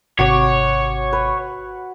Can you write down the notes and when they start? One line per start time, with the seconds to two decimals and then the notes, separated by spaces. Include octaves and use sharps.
0.19 G#1 C3 F#4 C#5 D6
1.13 B4